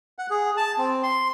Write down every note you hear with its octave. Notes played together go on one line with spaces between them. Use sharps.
F#5
G#4
A5
C4
C6